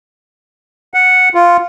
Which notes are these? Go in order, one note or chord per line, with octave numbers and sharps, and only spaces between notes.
F#5
F4